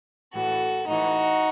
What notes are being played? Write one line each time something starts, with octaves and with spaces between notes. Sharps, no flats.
A2 E3 F#4 A4
A2 E3 D#4 F#4